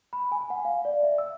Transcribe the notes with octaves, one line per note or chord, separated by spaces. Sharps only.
B5
G#5
F#5
F5
D5
E5
E6